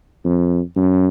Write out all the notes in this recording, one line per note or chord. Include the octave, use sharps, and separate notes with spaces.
F2
F#2